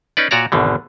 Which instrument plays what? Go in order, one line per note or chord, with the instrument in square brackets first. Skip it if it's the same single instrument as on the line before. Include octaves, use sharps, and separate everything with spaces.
[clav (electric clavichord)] C#4 D#4 B4 D5
A#2 F#4 C#5 D5 A#5
G#1 E2 B2 D3